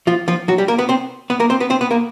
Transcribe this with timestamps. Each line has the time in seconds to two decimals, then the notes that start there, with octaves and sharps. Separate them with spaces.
0.07 F3 F4
0.28 F3 F4
0.48 F#3 F#4
0.58 G3 G4
0.68 A#3 A#4
0.78 B3 B4
0.89 C4 C5
1.30 B3 B4
1.40 A#3 A#4
1.50 C4 C5
1.60 B3 B4
1.70 C4 C5
1.81 B3 B4
1.91 A#3 A#4